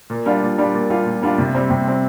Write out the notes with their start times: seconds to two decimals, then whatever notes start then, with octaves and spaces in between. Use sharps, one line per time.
0.10 A#2
0.26 G3 D4 F4
0.42 A#2
0.58 G3 D4 F4
0.74 A#2
0.90 G3 D4 F4
1.06 A#2
1.22 G3 D4 F4
1.38 C3
1.55 G3 C4
1.70 C3
1.86 G3 C4